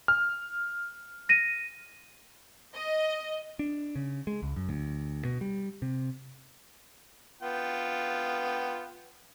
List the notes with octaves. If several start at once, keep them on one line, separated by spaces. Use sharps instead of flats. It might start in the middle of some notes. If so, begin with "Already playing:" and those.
F6
A#6 D#7
D#5
D4
C#3
G#3
C#2
F#2
D2
B2
G3
C3
B3 F4 G5